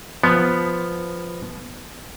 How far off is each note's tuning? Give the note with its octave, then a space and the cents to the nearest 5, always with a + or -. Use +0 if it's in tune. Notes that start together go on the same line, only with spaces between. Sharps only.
F3 +0 B3 +0